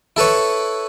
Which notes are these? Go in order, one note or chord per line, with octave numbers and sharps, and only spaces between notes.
E4 A4 B4 C#5